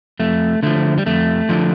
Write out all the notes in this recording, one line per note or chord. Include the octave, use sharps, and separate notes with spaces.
F2 A3
D3 F3 A3
G3
F2 A3
D3 F3